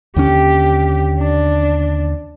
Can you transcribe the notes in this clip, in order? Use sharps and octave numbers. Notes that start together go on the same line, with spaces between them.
D#2 D3 C#4 G4
D4